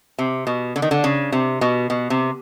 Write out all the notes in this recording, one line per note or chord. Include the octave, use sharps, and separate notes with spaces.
C3
B2
D3
D#3
D3
C#3
C3
B2
B2
C3